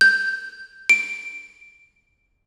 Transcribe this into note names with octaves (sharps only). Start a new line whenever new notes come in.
G6
D7